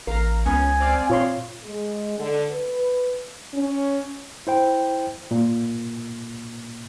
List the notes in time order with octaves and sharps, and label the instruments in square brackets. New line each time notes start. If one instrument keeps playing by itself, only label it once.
[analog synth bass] A1 [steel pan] A#4 [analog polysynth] F5 A#5
[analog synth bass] C#2 [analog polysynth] B3 C#4 [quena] G#5
[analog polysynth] C4 D5 F5
[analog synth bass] A#2 [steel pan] F4 C#5 C6
[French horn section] G#3
D3
B4
C#4
[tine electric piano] E4 C5 G5
A#2